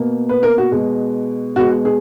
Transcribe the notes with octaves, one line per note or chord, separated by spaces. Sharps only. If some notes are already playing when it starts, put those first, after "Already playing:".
Already playing: B2 A#3
B4
A#4
F#4
B2 G#3
B2 G#3 F#4
G#4